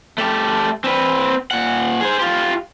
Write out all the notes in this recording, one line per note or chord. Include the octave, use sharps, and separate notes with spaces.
A3 G4
C4 B4
A#2 F#5
G#4 C5
F4 G4